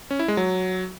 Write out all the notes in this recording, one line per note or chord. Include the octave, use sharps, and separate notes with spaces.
C#4
E4
G#3
F#3